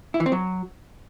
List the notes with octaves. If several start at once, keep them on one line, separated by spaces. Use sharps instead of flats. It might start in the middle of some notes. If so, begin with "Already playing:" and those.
E4
E3
C4
F#3